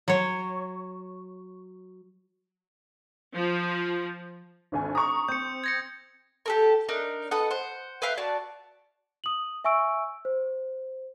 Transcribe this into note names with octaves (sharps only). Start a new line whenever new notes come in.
F#3 C#5
F3
G#1 D2 G#5
A#5 C#6 D#6
C4 G6 C#7
G#6 A#6 C#7
G4 A4 A#4
D4 D#4 A#4
A4 B4 D#5 F#5
C5 F#5
B4 E5 F5 G5
F#4 D5 A5
D#6 F#7
E5 G#5 C#6 E6 D7
C5